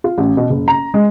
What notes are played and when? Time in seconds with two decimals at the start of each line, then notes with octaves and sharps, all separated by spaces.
0.04 F4
0.18 A1
0.37 B2
0.50 F#1
0.68 A#5
0.94 G#3